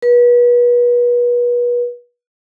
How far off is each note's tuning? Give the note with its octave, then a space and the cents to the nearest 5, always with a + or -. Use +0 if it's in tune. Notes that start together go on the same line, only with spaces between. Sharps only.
B4 -35